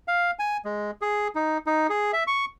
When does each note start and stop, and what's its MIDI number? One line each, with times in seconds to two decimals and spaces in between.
0.08 0.31 77
0.39 0.57 80
0.65 0.91 56
1.02 1.28 68
1.35 1.58 63
1.67 1.87 63
1.90 2.12 68
2.13 2.24 76
2.27 2.45 85